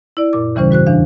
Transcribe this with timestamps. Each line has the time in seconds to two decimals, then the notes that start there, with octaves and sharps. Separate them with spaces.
0.17 E4 D5
0.33 F#2 A#2 D6
0.55 D#2 C#3 E3 G3 C#4 C5
0.71 G#2 F#4 C5 F#6
0.86 E2 E3 D4 F5